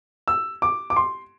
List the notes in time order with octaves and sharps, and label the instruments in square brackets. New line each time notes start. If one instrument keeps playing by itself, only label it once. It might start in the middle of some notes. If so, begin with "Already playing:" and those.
[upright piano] E6
D6
D6
C6